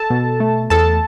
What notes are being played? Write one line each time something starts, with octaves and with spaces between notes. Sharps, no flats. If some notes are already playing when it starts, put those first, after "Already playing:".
Already playing: A4 A5
B2
A3
E2 A4 A5